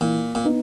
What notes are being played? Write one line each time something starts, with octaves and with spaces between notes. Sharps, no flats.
A#2 E3
A#2
B3 D#4